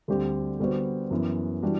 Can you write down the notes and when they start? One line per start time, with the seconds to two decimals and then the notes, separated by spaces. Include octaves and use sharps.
0.08 D2 D3 G3 C4 G4
0.60 D3 G3 B3 F#4 C5
1.11 F#2 E3 B3
1.62 E3 G3 D4 F#4